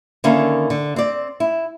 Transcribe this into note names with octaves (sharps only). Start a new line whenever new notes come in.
D3 D#3 A#3 C#4 E4
D3
C4 D5
E4